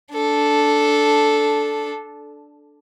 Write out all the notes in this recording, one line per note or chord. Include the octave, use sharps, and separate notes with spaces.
D4 A4